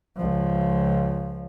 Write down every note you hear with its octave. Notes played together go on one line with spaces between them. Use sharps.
C#2 F3